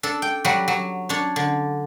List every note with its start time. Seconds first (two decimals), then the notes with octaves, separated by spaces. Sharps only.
0.03 D4 A4
0.22 G5
0.44 F#3 G3 F#4
0.68 F#3
1.09 D4 C#5
1.36 D3